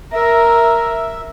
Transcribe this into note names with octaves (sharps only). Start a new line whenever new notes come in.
A#4 E5